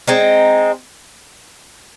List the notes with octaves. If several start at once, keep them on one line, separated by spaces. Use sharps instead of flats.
G#3 C4 D#4